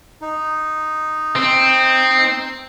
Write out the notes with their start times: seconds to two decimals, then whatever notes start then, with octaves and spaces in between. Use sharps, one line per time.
0.21 D#4
1.36 C4